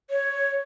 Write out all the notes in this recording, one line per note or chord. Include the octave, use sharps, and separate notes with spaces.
C#5